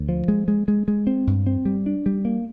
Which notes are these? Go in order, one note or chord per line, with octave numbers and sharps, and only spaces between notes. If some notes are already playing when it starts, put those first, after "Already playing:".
Already playing: D2
F3
G#3
G#3
G#3
G#3
C4
G2
C4
G3
D4
G3
A#3